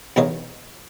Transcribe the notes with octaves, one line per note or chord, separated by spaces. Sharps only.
B1 E2 D#3 C#5 D#5 F5